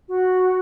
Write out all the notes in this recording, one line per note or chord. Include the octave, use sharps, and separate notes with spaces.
F#4